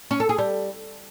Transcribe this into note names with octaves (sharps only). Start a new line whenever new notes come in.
C#4
A4
G#4
G3